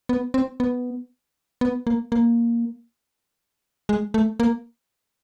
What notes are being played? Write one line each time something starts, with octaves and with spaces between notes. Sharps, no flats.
B3
C4
B3
B3
A#3
A#3
G#3
A3
A#3